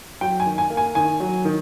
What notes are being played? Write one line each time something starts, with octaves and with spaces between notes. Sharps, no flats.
F#3 G5
G#5
D#3
G#5
A#3
G#5
D#3 G#5
F#3
D#3